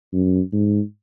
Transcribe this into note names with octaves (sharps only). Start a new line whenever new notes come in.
F#2
G#2